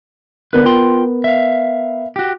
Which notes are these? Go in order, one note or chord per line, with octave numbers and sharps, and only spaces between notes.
D3 B3 A#4 B4
F4 G5 C6
E5 F5
F#4 G4